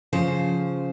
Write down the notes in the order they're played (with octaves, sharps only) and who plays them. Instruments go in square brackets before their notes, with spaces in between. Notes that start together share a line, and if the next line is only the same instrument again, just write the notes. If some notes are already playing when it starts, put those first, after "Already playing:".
[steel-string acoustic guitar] C#3 F3 C5